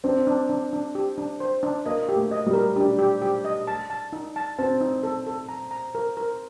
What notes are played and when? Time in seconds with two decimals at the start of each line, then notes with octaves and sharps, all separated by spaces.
0.04 C4 D4
0.27 D4
0.50 D4
0.73 D4
0.95 G4
1.18 D4
1.40 C5
1.63 D4
1.86 A#3 D#5
2.09 G4
2.16 A3
2.31 D#5
2.46 G3
2.53 A#4
2.76 D4 G4
2.99 G4
3.22 G4
3.45 D#5
3.67 A5
3.90 A5
4.13 D#4
4.36 A5
4.58 C4 A5
4.81 D#4
5.03 A4
5.27 A4
5.49 A#5
5.71 A#5
5.95 A#4
6.17 A#4